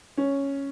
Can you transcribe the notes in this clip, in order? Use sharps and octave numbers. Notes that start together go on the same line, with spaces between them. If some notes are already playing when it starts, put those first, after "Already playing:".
C#4